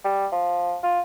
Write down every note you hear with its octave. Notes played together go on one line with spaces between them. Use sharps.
G3
F3
F4